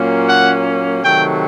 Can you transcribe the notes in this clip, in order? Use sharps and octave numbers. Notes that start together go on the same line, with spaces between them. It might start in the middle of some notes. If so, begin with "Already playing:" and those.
Already playing: A#2 F#3 A#3 C#4
F#5
C3 D#3 F#3 A3 G5